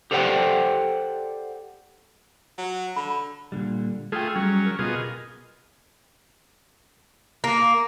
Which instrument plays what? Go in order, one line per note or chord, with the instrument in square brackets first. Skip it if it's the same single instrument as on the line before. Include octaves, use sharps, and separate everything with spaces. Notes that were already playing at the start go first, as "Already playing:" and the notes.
[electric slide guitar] G4 A4 C5 D5 F#5 G5
[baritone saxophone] F#3
[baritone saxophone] D3 [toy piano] B5
[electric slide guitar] A#2 D3 G3
[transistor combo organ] A3 F4 G#4 [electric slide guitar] A4 G5
[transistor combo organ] F#3 C#4 [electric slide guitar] G3 G#4 A#5
[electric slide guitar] A#4
[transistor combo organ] B2 F4 G#4 [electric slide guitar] G4 A#4 D#5
[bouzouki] A#3